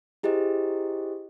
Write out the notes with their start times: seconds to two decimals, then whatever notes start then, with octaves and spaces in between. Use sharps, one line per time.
0.23 E4 G4 G#4 C5 D#5